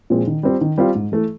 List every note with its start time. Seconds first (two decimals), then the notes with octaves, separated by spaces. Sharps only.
0.10 A#2 F3 G#3 C4
0.27 D#3
0.43 G3 C4 F4
0.61 D#3
0.78 G3 C4 F4
0.95 G#2
1.12 E3 A3